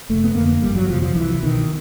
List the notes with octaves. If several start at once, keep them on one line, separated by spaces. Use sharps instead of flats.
F1 A3
B3
F2 D3 A#3
G1 G3
F#3
F2 C3 F3
F3
C2 E3
B2 D#3